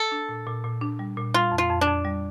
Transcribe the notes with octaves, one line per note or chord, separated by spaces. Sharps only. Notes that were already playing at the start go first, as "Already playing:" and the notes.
Already playing: A4
D4
A#2
A#2
A#2
D4
G3
A#2
G3 F4
F2
F4
F2
D4
F2
G3